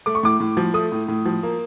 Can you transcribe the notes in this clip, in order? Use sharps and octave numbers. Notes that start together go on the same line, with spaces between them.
A3 D6
C#6
A2 D6
A2
F3
A3 D#6
A2
A2
F3
A#3